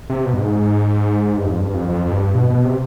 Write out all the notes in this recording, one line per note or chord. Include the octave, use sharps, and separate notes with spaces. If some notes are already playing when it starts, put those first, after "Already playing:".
C3
B2
G2
G#2
G2
F2
G2
F2
F2
F2
G2
B2
B2
C3